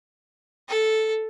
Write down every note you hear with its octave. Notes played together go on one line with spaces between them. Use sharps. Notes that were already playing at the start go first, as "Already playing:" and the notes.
A4